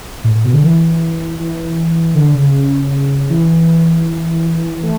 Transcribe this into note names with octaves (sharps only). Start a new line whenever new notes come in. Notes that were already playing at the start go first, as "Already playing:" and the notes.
A2
A2
B2
D3
E3
E3
D3
C#3
E3
A3